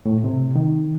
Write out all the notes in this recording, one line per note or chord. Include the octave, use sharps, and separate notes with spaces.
A2
C3
D#3